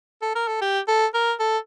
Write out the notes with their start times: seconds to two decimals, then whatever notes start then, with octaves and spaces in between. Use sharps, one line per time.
0.22 A4
0.35 A#4
0.48 A4
0.62 G4
0.88 A4
1.14 A#4
1.40 A4